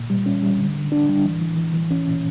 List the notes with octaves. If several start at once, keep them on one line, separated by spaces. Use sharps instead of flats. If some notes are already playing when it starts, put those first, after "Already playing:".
Already playing: A#2
G3
C#4
G3
D3
D3
D4
G3
E3
E3
E3
E3
C#4
A#2